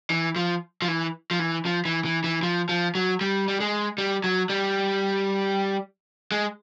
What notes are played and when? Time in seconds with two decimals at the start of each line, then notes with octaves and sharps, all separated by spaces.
0.10 E3
0.36 F3
0.82 F3
0.88 E3
1.31 F3
1.39 E3
1.65 F3
1.85 E3
2.05 E3
2.24 E3
2.43 F3
2.69 F3
2.95 F#3
3.21 G3
3.48 G3
3.60 G#3
3.98 G3
4.24 F#3
4.50 G3
6.32 G#3